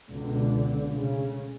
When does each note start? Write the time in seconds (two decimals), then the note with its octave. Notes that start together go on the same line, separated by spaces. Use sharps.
0.10 C#2 B2 D3
0.93 C#3